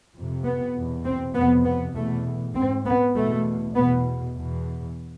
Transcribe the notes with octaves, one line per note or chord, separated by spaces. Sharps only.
F2 C3
B3
E2 B2
C4
F2 C3 B3
B3
E2 B2 A3
G#2 C4
B3
E2 B2 A3
E2 B2 B3
E2 B2